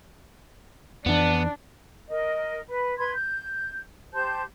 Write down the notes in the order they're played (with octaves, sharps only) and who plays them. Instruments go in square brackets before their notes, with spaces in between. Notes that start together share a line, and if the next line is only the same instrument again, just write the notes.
[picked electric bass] F2 E3 [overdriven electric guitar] B3 [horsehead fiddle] D4
[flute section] A#4 D#5
B4
B4 C6 G#6
G6
G4 C5 A5 G6